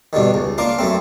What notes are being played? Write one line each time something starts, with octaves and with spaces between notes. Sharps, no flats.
G2 B2 D3 D#3
C#2
A#3 D4 F4 A#4
F#2 A3 C4